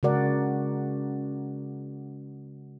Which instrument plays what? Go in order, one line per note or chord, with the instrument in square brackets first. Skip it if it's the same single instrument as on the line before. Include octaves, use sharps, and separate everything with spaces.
[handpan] C#3 G#3 F#4 A#4 D5 F#5